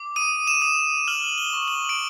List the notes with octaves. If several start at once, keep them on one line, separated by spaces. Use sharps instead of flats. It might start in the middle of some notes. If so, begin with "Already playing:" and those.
Already playing: D6
D#6 D#7
E7
D#6
F6 F#7
G7
C#6
F#7
D7